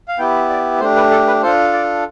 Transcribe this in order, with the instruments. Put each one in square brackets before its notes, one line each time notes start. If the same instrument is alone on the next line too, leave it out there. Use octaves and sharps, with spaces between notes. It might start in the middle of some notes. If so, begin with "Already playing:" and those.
[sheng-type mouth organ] F5
B3 E4 G4 G5
D5
A3 C5
D4 G4
B4
A4
B4
D4 F4 A4 C5
D5